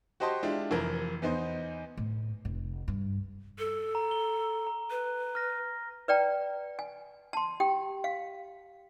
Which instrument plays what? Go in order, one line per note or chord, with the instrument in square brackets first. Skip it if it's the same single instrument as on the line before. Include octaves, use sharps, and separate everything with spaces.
[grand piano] F#4 G4 C5 D#5 A5 C6
G#3 D4 E4 F4 G4
F1 E3 F3 A#4
E2 B3 D#4 C5
[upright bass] A2
F1
G2
[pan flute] A4
[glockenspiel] A#5
G7
A#5
[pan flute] B4
[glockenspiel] F6 A#6
[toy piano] B4 D5 G5 A#5
G#5
A5 C6
G4 G5
F5